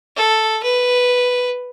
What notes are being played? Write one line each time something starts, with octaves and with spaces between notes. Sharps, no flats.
A4
B4